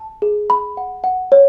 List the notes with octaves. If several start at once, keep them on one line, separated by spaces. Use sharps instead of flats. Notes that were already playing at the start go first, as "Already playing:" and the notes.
Already playing: A5
G#4
B5
F#5
F#5
C#5